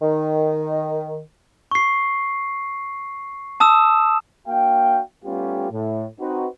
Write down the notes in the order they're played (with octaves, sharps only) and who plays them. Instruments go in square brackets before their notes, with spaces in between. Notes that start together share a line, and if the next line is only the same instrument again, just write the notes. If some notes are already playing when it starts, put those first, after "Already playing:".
[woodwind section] D#3
[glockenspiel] C#6 C7
A5 D#6 E6 E7
[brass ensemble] A#3 D4 F#4 F5 G5
G3 A3 B3 C#4 F4 G4
A2
C4 D#4 F#4 B4